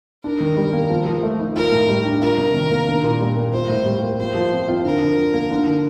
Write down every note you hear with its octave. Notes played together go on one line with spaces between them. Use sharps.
D4 A#4
D#3
G3
A#3
F3
F3
A3
D#4
F4 A#4
A2
G3
D4
F4 A#4
C3
D#3
A#3
D4
A#2
G3
A#3
F4 C5
A2
G3
A#3
F3 C5
F3
C4
F4
D3 A#4
D3
F3
A#3
D3
D3